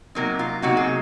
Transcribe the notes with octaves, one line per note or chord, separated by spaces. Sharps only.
C3 F#3 A#3 D#4 A#4
F4
C3 F#3 A#3 D#4 F#4
G#4